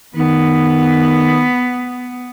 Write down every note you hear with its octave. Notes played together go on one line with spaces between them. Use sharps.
D#3 B3